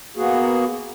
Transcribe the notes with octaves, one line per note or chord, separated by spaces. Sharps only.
A#3 B3 F#4 G#4